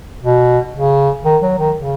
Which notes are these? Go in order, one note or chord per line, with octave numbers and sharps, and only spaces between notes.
B2
C#3
D#3
F#3
D#3
C#3